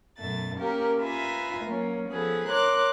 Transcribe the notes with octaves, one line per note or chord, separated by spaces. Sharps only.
F#2 B2 A3 A6
A#3 C#4 G4 A#4
F4 B4 E5 G#5 A#5
F#3 A#3 C#4
F3 B3 G#4 A4 B4
A#4 C#5 C6 D6 F#6